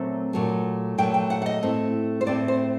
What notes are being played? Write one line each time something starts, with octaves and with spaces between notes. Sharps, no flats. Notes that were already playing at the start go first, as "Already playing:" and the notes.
Already playing: A#2 F#3 A3 C4
A#2 F#3 A3
A#2 F#3 A3 G5
G5
F#5
F#5
D#5
A2 A3 C4
C5
A2 A3 C4 D5
C5